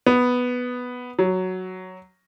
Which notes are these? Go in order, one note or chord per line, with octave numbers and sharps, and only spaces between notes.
B3
F#3